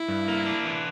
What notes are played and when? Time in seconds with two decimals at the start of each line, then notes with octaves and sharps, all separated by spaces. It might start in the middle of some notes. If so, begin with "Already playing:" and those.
Already playing: E4
0.08 G2
0.28 A#3
0.46 D4
0.65 E3